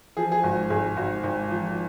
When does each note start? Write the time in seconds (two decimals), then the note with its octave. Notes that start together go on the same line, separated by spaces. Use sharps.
0.17 F3 G#4
0.32 G#4
0.43 G#1 F#4
0.70 G#1 G#4
0.97 G#1 F#4
1.23 G#1
1.51 F3